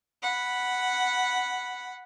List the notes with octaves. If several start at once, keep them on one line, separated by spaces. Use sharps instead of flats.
F#5 B5